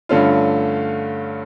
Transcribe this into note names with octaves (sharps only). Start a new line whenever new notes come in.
G2 D3 A3 C#4 F4